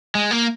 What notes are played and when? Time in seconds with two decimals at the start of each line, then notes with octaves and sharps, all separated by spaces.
0.15 G#3
0.31 A#3